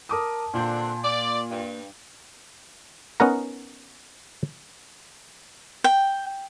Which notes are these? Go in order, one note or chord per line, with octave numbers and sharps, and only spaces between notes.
A#4 A5 D6 D#6
A#2 D3 C4 D4 G6
A#3 D5
G2
B3 C#4 D#4 A#4 F#5 A#5
G5